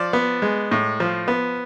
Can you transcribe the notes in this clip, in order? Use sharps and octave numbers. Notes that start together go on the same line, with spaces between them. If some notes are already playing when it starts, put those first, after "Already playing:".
Already playing: F3 D5
B3
G#3
A2
F3
B3